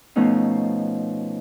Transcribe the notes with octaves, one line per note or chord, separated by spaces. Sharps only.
B2 F3 A3 C#4 D#4